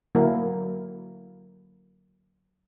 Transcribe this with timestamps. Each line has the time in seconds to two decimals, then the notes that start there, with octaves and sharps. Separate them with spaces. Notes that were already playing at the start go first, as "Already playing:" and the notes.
0.15 D3 F#3 A#3 E4 A#4